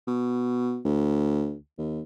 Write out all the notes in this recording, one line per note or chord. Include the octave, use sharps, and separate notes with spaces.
B2
D2
D#2